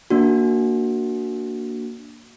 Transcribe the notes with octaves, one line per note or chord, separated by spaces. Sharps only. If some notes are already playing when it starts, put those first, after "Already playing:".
A#3 D4 F#4